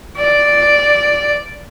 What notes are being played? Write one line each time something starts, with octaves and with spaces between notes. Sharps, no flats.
D5